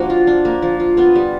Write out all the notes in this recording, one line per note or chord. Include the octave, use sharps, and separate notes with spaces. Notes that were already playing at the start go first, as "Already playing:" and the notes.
Already playing: F3 A#3 D4 F#4
F4
D4
A#3
F3
F4
B3 F4
G3